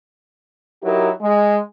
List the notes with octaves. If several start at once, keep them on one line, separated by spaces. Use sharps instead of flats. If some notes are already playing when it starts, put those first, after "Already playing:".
F#3 D#4 E4 G4 A#4
G#3